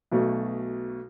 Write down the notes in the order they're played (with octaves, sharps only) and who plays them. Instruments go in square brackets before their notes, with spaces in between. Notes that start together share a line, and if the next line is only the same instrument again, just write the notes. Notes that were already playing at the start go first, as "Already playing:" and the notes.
[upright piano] B1 B2 A3